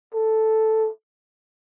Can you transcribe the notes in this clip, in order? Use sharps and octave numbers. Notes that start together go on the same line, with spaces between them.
A4